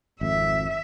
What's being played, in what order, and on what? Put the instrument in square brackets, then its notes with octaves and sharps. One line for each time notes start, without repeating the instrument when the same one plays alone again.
[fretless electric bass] G#1 F2 [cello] E5